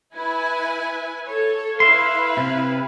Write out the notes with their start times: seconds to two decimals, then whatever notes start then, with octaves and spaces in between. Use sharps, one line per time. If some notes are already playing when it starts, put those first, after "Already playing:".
0.14 E4 B4 G#5
1.26 A4 C#5
1.80 E4 B4 E5 F5 C6
2.37 C3